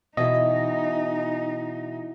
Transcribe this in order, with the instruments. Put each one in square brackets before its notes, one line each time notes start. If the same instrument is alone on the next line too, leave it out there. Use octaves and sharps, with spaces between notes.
[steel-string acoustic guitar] B2 E3 E5 [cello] D#4 [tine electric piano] D#5